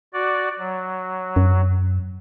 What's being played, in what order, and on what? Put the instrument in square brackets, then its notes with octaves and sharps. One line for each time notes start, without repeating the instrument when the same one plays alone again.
[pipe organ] F#4 D5
F#3
[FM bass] F#2